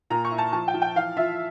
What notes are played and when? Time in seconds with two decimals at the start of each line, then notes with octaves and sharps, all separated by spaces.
0.10 A#2 A#5
0.25 C#6
0.31 E4
0.38 A5
0.52 F3 A5
0.68 G5
0.74 F3
0.82 G5
0.95 E3 F5
1.16 F4 E5